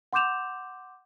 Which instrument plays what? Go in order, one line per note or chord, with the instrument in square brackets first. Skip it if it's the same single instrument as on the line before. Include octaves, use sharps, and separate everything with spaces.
[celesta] F#5 C6 D6 G6 E7 F7